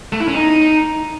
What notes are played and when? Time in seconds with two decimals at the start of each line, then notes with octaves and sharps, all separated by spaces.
0.12 A3
0.20 E4
0.28 C#4
0.35 D#4